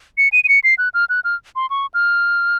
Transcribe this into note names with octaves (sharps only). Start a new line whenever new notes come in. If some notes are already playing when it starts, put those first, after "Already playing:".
C#7
D#7
D#7
C#7
C7
F#6
F6
F#6
F6
C6
C#6
F6